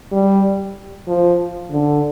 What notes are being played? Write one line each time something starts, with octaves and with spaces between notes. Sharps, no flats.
G3
F3
D3